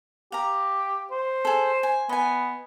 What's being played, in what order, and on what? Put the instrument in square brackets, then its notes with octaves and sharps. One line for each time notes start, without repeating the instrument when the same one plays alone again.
[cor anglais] G4 [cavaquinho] F5 A#5
[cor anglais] C5
[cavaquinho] G#4 A4
G#5
[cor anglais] B3 [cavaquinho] D#5 G#5